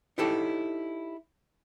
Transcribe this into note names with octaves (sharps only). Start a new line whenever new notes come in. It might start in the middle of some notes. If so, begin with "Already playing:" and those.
D#4 E4 G4 A4 C#5